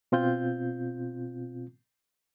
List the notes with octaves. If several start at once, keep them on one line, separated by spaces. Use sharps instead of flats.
B2 C4 F4 G6